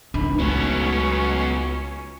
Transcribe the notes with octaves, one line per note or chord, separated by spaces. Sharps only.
C#2 D4 D#4 B5
F#3 A3 B3 C#4 D#4